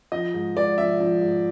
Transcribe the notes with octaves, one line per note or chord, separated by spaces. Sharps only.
F3 D#5
G#2
G#2 D5
F3 E5
F3
G#2